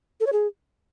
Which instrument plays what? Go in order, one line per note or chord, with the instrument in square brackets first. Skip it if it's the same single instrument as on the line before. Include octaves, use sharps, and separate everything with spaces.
[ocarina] A4
C#5
G#4